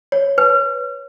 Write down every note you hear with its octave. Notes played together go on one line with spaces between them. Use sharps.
C#5
B4